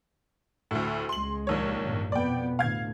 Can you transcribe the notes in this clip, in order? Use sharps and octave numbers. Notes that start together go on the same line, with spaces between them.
D2 A2
C#2 G#3 C6 F#7
A#1 D#2 C#5
G1 A2
F2 B2 B3 D5 G5
D2 A2 F5 G#6